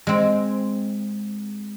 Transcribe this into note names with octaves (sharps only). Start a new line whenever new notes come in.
G#3 C4